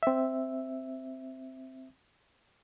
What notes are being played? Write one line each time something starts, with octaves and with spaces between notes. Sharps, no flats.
C4 E5